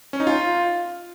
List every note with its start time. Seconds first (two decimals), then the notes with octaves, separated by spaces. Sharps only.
0.13 C#4
0.20 D#4
0.27 F4